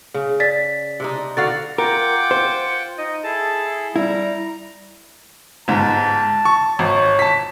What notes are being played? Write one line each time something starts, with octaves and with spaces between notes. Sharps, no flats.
C#3
D5 A6 B6
C3 D4 D#4
D3 F#4 F5 A6
F4 A#4 F#5 G5 D6
C5
D#4 D#5
E4 G#4 A4 A5
G3 E4 A#5
G1 G#2 A5
C#6
G#1 C#5
A5 B6